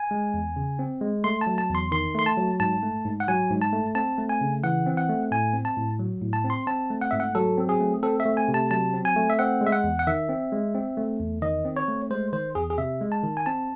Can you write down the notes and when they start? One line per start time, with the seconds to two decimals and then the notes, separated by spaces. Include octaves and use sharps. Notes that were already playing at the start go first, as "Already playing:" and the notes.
Already playing: G#5
0.11 G#3
0.34 E2
0.56 C#3
0.79 C4
1.01 G#3
1.24 A3 C6
1.41 A5
1.47 F#3
1.58 A5
1.69 E2
1.75 C6
1.92 D#3 C6
2.15 A3 C6
2.26 A5
2.37 F#3
2.60 G#2 A5
2.83 A3
3.05 G#2
3.20 F#5
3.28 F#3 G#5
3.51 G#2
3.62 A5
3.73 A3
3.95 C4 A5
4.18 A3
4.29 G#5
4.41 C#3
4.63 E3 F#5
4.86 C4
4.97 F#5
5.09 A3
5.31 A2 G#5
5.54 C4
5.65 A5
5.77 A2
5.99 F#3
6.22 A2
6.33 A5
6.44 C4
6.50 C6
6.67 C4 A5
6.90 A3
7.01 F#5
7.11 G#2 E5
7.20 F#5
7.35 F#3 A4
7.58 C4
7.69 G#4
7.80 A3
8.03 C4 A4
8.20 E5
8.26 A3
8.37 G#5
8.48 C3
8.54 A5
8.71 F#3 A5
8.94 C4
9.05 G#5
9.16 A3
9.30 E5
9.39 C4 F#5
9.61 G#3
9.67 E5
9.72 F#5
9.84 E2
9.99 F#5
10.07 D#3 E5
10.29 C4
10.52 G#3
10.75 C4
10.97 A3
11.20 E2
11.42 D#3 D#5
11.65 C4
11.77 C#5
11.88 A3
12.10 G#3 C5
12.33 D#3 C5
12.55 E2 G#4
12.70 G#4
12.78 C3 E5
13.01 G#3
13.12 A5
13.23 D#3
13.37 G#5
13.46 C4 A5